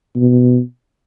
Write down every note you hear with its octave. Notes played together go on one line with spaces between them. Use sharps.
B2